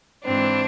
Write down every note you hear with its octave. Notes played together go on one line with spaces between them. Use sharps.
G#2 E3 C4 D4